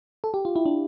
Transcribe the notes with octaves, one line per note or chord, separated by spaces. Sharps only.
A4
G4
F4
E4
D4